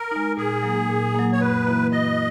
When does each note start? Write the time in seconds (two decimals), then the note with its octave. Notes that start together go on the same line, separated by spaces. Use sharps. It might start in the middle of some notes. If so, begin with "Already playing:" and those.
Already playing: A#4
0.11 G#3 D#4
0.37 A#2 G#4
0.63 F#3 A#3
0.89 A#2
1.15 F#3 A#3
1.33 C#5
1.41 F#2 B4
1.67 E3 A#3 E4
1.92 F#2 D#5